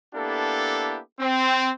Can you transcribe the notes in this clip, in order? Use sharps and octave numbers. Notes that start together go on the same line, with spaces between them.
A#3 B3 D4 E4 G4 A4
C4